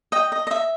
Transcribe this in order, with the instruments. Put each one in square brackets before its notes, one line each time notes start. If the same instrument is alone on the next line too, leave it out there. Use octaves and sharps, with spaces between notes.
[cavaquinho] D#5 G5
D#5
D#5
E5